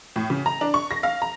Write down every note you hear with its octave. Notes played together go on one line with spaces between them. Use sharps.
A2
C#3
A#5
D4
C#6
A#6
F5
A#5